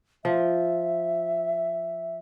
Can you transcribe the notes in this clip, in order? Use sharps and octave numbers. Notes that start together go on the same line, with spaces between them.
F3 E5